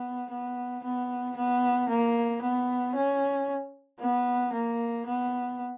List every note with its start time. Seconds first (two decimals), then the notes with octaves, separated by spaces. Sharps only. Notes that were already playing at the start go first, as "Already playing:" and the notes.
Already playing: B3
0.30 B3
0.84 B3
1.37 B3
1.89 A#3
2.42 B3
2.95 C#4
4.00 B3
4.53 A#3
5.06 B3